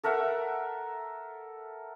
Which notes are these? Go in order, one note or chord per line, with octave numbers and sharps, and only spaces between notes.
A4 A#4 E5 F#5